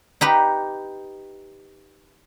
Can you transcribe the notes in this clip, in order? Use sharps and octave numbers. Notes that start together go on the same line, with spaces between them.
D#4 G4 B4